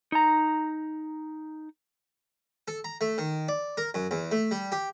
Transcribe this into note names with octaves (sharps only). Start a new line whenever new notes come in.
D#4 A#5
A4
A#5
A3
D#3
D5
A#4
F#2
E2
A3
G3
G4